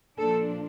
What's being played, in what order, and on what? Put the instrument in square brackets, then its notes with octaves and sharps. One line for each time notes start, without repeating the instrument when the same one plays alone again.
[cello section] A#2 F3 A#3 D4 A4